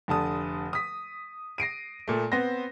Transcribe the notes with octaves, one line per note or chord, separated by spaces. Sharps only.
F1 D3 A5 D#6
D#6 B6
A#6 C7 D7 D#7
A#2 A3
B3 C4 C5 A#6